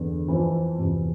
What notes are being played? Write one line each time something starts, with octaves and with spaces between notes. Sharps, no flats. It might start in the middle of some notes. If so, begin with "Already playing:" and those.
Already playing: E2 D3
F2 E3
E2 C3 E3